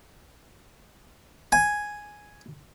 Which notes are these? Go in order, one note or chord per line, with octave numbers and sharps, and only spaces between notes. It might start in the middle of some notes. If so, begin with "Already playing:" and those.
G#5